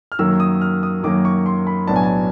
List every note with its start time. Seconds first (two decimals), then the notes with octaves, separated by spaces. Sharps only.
0.12 F6
0.19 F#2 D#3 F#3 A#3 E6
0.40 D#6
0.61 F6
0.83 D#6
1.03 F#2 D#3 F#3 A#3 D6
1.25 C#6
1.46 C6
1.67 B5
1.87 B1 A2 F#3 B3 D4 A5
1.96 G#5
2.03 A5